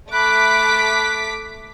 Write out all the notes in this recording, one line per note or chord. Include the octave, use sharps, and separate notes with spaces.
A3 B5 D6 F#6 B6